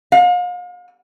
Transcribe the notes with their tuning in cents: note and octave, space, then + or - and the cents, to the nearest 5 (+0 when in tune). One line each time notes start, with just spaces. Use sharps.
F5 +40